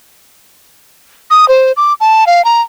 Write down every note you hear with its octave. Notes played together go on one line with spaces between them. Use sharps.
D#6
C5
D6
A5
F5
A#5